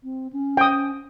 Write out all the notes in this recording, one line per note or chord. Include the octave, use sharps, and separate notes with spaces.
C4
C#4
G5 D#6